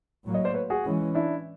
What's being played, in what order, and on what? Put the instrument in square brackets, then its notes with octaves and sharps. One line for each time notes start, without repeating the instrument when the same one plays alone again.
[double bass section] A2 F#3 A#3
[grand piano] C#5 D#5
C5 D5
B4 C#5
F#4 G#4
[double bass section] E3 G#3 C#4
[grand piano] D4 E4